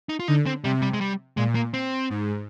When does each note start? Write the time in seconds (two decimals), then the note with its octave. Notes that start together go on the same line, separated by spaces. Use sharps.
0.09 D#4
0.20 F4
0.28 D3 D#4
0.46 C4
0.64 C3 G3
0.82 G3
0.93 G#3
1.01 G3
1.37 A#2 G#3
1.55 A#3
1.74 C4
2.10 G#2